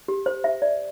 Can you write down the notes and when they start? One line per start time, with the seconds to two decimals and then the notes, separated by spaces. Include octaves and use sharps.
0.08 G4
0.26 C5
0.44 E5
0.62 D5